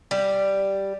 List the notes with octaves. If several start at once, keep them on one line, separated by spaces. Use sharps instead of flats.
G3